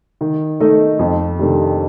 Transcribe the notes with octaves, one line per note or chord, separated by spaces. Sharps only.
D#3
A3 D#4 A4 D#5
F2
C3 D#3 A3 D4